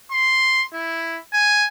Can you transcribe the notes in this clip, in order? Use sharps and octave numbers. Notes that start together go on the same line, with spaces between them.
C6
E4
G#5